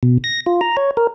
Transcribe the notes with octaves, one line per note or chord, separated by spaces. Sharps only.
B2
A#6
F4
A#5
C#5
A#4